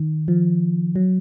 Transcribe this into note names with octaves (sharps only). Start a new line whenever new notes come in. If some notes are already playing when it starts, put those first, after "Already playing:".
Already playing: D#3
F3
F#3